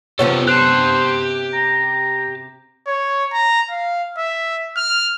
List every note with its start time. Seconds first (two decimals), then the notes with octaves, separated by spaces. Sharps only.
0.19 C3 B3 C#4 F4 A4 C#5
0.47 G4 C5 A5 F#6
1.53 A#5
2.87 C#5
3.32 A#5
3.71 F5
4.18 E5
4.77 F6